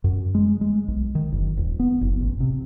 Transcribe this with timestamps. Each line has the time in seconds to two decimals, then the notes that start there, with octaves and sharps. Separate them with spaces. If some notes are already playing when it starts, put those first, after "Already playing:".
0.04 F#2
0.35 G#3
0.61 G#3
0.88 B1
1.15 D#3
1.32 F#1
1.57 D#1
1.79 B3
2.01 F#1
2.21 A1
2.40 C3